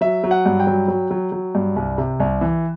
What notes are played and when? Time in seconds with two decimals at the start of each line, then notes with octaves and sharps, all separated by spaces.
0.01 F#3 E5
0.24 F#3
0.31 F#5
0.46 G2
0.60 G5
0.67 F#3
0.88 F#3
1.11 F#3
1.32 F#3
1.55 G2
1.76 C2
1.98 C3
2.20 C2
2.41 E3